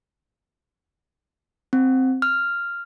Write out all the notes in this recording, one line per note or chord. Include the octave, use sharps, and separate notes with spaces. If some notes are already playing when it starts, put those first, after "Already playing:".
C4
F6